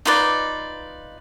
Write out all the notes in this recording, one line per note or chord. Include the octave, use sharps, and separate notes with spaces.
D#4 F4 B4 D5